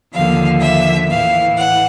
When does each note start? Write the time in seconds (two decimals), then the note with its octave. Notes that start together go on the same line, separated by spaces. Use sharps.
0.13 D#2 D3 F3 F5
0.61 E5
1.10 A2 E3 F5
1.57 F#5